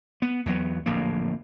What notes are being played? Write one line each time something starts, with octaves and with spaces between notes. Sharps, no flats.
B3
E2 F#3 G#3 B3
D1 A#1 F2 A#3